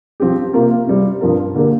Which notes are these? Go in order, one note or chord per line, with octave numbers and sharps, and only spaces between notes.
F3 C4 G4
C3 A#3 F4 A#4
C3 G3 C4
G2 F3 C4 A#4
D3 A#3 D4 G4 A#4